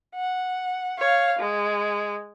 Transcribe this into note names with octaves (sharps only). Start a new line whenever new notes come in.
F#5
C#5 F5
G#3